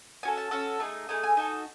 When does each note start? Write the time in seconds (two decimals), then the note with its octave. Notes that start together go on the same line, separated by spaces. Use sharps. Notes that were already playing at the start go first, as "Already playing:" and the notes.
0.23 C#4 F#4 A4 G#5
0.37 A5
0.51 C#4 F#4 A4
0.80 A3 D#4 G#4
1.08 A3 D#4 G#4 G#5
1.23 G#5
1.37 D#4 F#4 A4